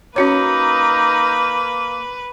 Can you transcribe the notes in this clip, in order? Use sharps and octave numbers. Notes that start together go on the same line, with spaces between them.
A#3 C#4 D#4 F#4 B4 C#5